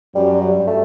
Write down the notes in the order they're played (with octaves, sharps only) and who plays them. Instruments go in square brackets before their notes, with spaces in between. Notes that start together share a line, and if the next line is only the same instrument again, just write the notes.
[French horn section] F#2 F#3 [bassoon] G3
[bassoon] G3
[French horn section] G2
[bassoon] A3